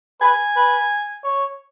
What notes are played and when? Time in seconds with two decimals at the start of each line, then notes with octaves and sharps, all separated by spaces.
0.21 B4 G#5
0.56 B4
1.24 C#5